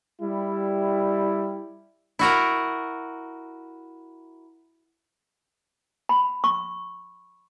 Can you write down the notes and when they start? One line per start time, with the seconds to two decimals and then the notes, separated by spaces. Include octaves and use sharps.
0.22 G3 E4
2.19 E4 F#4 A#4
6.09 B5
6.44 C#6